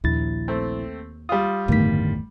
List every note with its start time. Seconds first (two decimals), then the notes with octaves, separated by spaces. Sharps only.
0.04 A#1 D#2 E4 A6
0.48 A3 C4
1.29 G3 F4 D#6
1.68 G1 E2 A2 D#3 B6